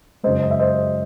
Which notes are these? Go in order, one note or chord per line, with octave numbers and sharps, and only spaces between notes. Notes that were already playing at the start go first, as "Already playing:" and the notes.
F#2 C#3 G#3 C5 D#5
D#5
E5
C5 D#5